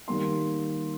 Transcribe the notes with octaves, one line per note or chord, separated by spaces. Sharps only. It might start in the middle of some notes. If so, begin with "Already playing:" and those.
D#3 G3 A#3 C6